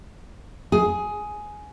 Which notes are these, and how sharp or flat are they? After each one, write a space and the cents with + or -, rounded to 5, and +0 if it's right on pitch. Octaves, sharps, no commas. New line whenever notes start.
G#4 +10